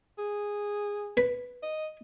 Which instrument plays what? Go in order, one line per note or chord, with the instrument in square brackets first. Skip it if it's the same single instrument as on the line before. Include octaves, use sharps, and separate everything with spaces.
[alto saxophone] G#4
[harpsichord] B4
[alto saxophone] D#5